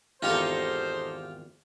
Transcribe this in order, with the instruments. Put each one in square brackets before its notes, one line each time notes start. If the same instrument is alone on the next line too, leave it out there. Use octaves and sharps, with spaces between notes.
[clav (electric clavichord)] G#1 E2 [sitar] D#4 A4 [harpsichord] F4 G4 F5 [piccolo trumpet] C5